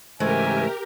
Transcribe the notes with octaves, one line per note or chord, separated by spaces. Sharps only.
G#2 C#3 E3 A3 G4 A#4 E5 G#5